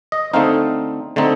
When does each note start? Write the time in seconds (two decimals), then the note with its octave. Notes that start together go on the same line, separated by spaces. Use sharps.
0.12 D#5
0.34 D3 A3 C4 D#4 F5
1.16 D3 A3 C4 D#4